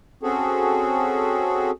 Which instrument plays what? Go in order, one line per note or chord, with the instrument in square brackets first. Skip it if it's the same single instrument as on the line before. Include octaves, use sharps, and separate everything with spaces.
[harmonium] C4 C#4 F#4 G#4 A4